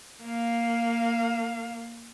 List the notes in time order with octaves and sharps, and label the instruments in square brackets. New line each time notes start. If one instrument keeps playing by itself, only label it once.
[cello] A#3 F5